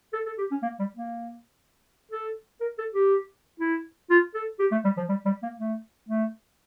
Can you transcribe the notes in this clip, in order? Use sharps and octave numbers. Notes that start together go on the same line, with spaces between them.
A4
A4
G4
C#4
A#3
G3
A#3
A4
A#4
A4
G4
E4
F4
A4
G4
A3
G3
F3
G3
G3
A#3
A3
A3